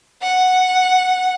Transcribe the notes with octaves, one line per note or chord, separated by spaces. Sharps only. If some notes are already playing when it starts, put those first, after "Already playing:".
F#5